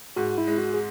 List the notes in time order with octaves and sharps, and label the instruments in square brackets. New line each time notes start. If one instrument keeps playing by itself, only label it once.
[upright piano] G#2 [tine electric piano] F#4
[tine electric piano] E4
[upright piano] G#3
[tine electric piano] F#4
G#4